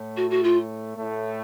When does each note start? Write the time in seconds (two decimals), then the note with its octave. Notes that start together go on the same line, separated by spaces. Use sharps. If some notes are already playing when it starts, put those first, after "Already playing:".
Already playing: A2 A3
0.16 F#4
0.30 F#4
0.43 F4
0.95 A2 A3